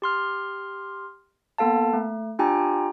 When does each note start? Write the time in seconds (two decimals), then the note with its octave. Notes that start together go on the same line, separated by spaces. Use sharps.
0.02 G4 C6 F6
1.58 A#3 B3 A4 F5 A5
1.93 A3
2.39 D4 F4 G4 G5 G#5 A#5